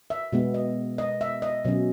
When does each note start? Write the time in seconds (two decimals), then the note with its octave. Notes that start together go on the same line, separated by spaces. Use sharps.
0.10 E5
0.33 B2 G#3 B3
0.54 D#5
0.98 D#5
1.21 E5
1.42 D#5
1.64 B2 F#3 C#4